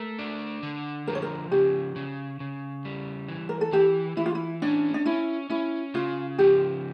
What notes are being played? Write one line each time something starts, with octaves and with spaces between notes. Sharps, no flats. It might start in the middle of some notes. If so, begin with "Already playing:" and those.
Already playing: A3 A#4
D4
D3
F3 A#4
C#5
A#4
C#3 G4
C#3
C#3
G3
E3
A#4
A4
E3 G4
E3 E4
F4
E4
C#4 D4
D4
C#4 E4
C#4 E4
C#3 F4
F3 G4